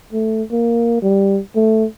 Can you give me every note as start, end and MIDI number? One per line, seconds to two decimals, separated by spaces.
0.13 0.43 57
0.52 1.02 58
1.02 1.40 55
1.55 1.85 57